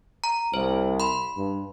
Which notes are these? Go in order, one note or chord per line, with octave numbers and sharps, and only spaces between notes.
A#5
C2 C5
B5 C6
G2